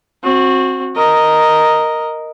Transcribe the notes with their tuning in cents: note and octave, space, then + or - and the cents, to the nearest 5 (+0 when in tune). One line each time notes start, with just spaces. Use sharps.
C4 +20 F#4 -15
A#4 +0 D#5 +0